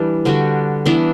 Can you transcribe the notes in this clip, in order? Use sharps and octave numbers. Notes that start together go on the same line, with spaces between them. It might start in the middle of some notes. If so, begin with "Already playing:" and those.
Already playing: E3 G3 D4
D3 G3 D4 F#4
E3 B3 D4